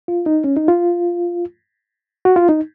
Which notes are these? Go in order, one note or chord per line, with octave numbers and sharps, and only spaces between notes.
F4
D#4
C#4
D#4
F4
F#4
F4
D#4